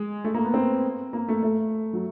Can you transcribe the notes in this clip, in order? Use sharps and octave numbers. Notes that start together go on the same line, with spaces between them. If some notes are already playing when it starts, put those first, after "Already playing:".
Already playing: G#3
A3
A#3
B3
C4
A#3
A3
A3
F#3